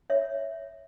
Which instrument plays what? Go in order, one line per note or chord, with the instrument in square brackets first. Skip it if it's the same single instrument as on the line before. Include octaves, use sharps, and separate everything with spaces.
[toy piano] C#5 E5